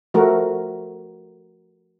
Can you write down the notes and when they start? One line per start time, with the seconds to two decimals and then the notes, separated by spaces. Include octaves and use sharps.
0.14 F3 A3 F#4 A#4